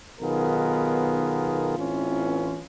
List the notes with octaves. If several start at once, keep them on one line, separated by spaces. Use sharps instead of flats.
B1 D#3 B3 F4 G#4 A#4
A1 E3 C4 C#4 F4